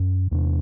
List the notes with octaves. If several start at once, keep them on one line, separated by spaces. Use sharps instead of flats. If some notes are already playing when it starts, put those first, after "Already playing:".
Already playing: F#2
E2 C3